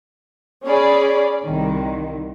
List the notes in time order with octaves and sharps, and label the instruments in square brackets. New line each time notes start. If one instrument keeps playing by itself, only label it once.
[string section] C#4 G#4 D5 B5
C2 D#3